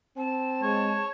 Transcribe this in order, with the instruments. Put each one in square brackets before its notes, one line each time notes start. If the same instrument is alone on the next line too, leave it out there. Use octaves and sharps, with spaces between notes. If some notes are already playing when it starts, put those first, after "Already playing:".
[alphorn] C4 [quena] A5
[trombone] G#3 [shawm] C#5